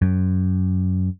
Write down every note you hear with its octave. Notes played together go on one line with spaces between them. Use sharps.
F#2